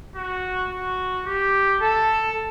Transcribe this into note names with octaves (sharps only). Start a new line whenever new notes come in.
F#4
F#4
G4
A4